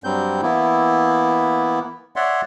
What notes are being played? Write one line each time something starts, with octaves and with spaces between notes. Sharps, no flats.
G2 F#3 G3 C4 G6
E3 A#3 B3 E4
C#5 D5 E5 F#5 C6